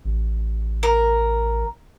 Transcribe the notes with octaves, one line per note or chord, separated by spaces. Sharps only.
A1
A#4